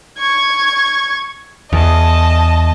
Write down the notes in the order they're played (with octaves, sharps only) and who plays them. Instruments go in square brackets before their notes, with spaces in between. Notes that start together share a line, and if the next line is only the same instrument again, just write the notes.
[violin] C#6 G#6
[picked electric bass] E2 [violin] D#5 A5